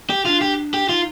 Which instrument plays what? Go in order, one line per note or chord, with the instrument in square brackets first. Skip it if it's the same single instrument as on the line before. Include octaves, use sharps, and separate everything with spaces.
[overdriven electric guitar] G4
[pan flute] D4 [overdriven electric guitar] F4
[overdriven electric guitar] G4
G4
[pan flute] D#4 [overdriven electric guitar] F4